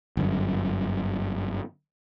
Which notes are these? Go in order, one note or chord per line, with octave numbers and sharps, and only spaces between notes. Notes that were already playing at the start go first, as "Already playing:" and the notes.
G1 F#2